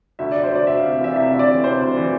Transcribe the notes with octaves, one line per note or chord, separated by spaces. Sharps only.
D2 E5
D2 D5
C5
D2 D5
D2 E5
F5
C3
F5
E3 E5
C3 E5
D2 E5
D5
E3
C3 C5
D2
E3